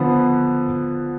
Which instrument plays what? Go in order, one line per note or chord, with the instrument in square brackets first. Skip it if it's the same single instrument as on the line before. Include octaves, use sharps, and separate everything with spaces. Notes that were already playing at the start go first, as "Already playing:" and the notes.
Already playing: [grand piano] D3 F3 B3